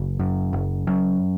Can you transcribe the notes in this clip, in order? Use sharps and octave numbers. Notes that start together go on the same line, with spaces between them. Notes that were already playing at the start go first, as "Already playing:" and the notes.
Already playing: F#1
F#2
F#1
F#2